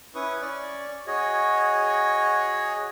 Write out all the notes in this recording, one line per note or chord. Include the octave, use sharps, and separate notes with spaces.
C#4 E4 B4 C#6 D#6
C#4 D5 C#6
F#4 G#4 C#5 D#5